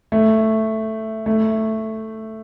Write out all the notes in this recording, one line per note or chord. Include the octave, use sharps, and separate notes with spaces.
A3
A3